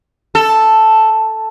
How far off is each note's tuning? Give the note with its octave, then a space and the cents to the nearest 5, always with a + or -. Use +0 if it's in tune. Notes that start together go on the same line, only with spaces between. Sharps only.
A4 +0